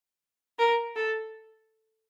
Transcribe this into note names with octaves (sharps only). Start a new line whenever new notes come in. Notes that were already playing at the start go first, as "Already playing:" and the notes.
A#4
A4